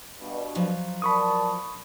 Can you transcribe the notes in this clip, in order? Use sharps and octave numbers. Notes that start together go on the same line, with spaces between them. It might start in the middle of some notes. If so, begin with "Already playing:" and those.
G2 B2
F3 F#3
A#4 D5 A5 B5 C#6 D#6